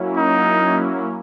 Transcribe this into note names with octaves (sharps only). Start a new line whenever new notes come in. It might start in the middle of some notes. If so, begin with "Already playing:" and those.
Already playing: F#3 A#3 C#4 E4
D#4